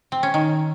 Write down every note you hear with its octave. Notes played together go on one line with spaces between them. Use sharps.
C4
C#4
D#3